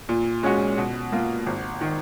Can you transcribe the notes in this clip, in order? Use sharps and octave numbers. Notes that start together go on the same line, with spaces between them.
A#2
G#3 C#4 F#4
B2
A#3 F4
G#1
D#3